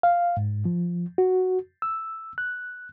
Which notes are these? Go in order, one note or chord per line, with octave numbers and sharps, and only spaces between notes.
F5
G#2
F3
F#4
E6
F#6